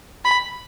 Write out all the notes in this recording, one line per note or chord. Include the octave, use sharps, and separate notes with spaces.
B5